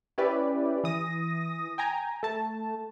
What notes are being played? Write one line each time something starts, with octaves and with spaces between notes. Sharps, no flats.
C#4 E4 G4 B4 D5
E3 D#6 A#6
G5 G#5 A#5
A3 A5